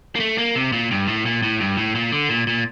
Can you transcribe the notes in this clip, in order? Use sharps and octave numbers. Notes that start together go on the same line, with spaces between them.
A#3
A3
A#3
C3
A#2
G2
A2
A#2
A2
G2
A2
A#2
D3
A#2
A#2